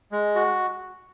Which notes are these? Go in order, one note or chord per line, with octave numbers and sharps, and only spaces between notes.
G#3
F#4